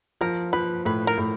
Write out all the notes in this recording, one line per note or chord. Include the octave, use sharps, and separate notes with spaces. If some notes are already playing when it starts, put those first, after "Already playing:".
F3 A#4
F3 B4
A2 B4
A#4
A2